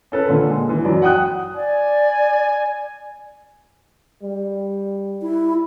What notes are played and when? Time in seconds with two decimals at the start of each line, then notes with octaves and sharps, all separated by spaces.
0.12 C#4 A4 B4
0.28 A#2 D3
0.50 G#3
0.69 E3
0.84 F#2 F#3 D5
1.02 F#5 G5 D#6 F#6
1.55 D5 G#5
4.23 G3
5.22 E4